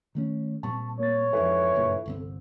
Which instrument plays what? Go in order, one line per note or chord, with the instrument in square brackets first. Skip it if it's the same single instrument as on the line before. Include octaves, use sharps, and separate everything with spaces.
[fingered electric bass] D#3 A3 C#4
[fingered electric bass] A#2 G3 C4 [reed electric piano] A5 C#6
[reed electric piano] A#3 A6 [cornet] C#5
[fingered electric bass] F2 G#2 [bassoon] E3 [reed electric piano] A4
[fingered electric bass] F#1 G2 A#2
G1 C2 C4